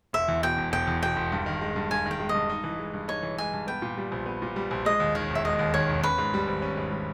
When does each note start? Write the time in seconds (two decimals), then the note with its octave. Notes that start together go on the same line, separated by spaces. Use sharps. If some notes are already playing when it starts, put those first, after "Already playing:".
0.13 E1 E5
0.28 E2
0.43 B2 G5
0.58 E1
0.72 E1 G5
0.87 E2
1.02 B2 G5
1.16 E1
1.32 G2
1.46 D#3
1.61 G#3
1.76 G2
1.91 G2 G#5
2.06 D#3
2.11 G5
2.20 G#3
2.29 D#5
2.34 G2
2.50 D#4
2.64 E3
2.79 G#3
2.94 G2
3.08 D#4 C#5
3.23 E3
3.38 G#3 G#5
3.53 G2
3.67 B3 G5
3.82 A#2
3.98 G3
4.12 A#1
4.26 B3
4.42 A#2
4.56 G3
4.71 A#1
4.85 G#3 D#5
5.00 D#2
5.15 D#3 C#5
5.30 E1
5.35 E5
5.44 G#3 D#5
5.59 D#2
5.74 D#3 C#5
5.89 E1
6.03 C#4 B4
6.18 G#2
6.34 G3
6.48 G#1
6.62 C#4
6.77 G#2
6.92 G3